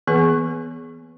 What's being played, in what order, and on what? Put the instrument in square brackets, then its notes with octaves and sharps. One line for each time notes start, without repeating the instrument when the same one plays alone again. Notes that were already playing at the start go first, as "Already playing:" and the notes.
[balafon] E3 A#3 B3 G#4 B4